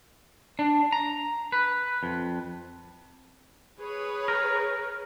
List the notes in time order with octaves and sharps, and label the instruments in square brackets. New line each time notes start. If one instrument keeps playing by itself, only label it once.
[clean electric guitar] D4
A#5
B4
F2
[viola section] G#4 B4 C#5
[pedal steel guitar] A#4